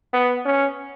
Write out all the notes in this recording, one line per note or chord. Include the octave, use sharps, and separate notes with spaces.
B3
C#4